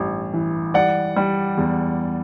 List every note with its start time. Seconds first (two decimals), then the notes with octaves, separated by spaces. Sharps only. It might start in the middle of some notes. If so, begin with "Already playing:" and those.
Already playing: A1 G2 E3
0.33 E3
0.74 G3 D5 F#5
1.17 G3
1.58 E2